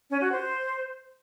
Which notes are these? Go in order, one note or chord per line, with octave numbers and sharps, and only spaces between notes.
C#4
F#4
C5